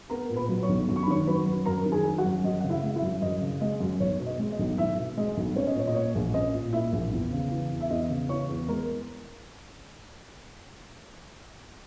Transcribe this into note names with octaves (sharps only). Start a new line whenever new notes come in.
B3 A#4 A#5
A#2
B4 B5
F#3
C#5 C#6
B1
F#2
C#6
B5
D#3 C#5 C#6
F#3 B4 B5
F#2
F#2 A#4 A#5
D#3
G#4 G#5
F#3
F#4 F#5
F#2
F#2 D#5
C#3 F#5
E4 E5
G#3
E4 E5
F#2
F#2 D#5
C#3
G#3 D#5
F#2
B1 C#5
B2
D#5
G#3
D#5
B1
B1 E4 E5
B2
G#3 D#5
B1
C#4 C#5
D#5
A#2 C#5
D#5
A#3 C#5
A#1
C#4 D#5
A#2
A#3 E4 E5
A#1
E2
C#3
E3
E2
E5
E2 D#5
C#3
E3 C#5 C#6
E2
G#3 A#4 A#5